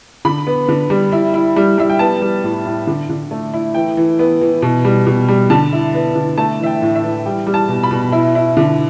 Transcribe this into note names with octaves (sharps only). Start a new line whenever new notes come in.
D3 B5
B3
D3
G3
E4
E4
G3
G3 E5
G5
B3 A5
G3
A2
A2
D3
D3
A3
E4
E3 G5
E3
B3
E3
B2
G3
B2
G3
D3 A5
E4
B3
D3
A3 A5
E3 E5
G5
A2
E5
E3
G3 G5
G3
A5
B2
B5
B2
E4
E4
D3